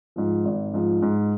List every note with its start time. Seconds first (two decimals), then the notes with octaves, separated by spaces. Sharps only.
0.16 G#2 F3
0.45 G#1
0.74 G#2 F3
1.02 G#2